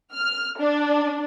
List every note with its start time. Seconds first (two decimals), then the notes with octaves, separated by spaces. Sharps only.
0.13 F6
0.58 D4